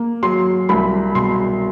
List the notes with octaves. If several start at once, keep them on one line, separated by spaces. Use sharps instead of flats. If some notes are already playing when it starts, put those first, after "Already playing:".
Already playing: A#3
F#3 C6
C2 B5
B2 C6